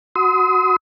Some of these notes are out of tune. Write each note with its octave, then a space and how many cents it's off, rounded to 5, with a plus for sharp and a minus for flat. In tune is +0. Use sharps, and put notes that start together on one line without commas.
F#4 +0 C6 -30 D#6 +35